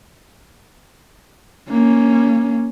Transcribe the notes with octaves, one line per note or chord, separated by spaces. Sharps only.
A#3 C#4